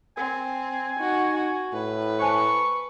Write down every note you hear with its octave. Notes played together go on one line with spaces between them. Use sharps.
C4 A#4 G#5
D#4 F#4
F#4
A2 B4
C5 G#5 A5 C#6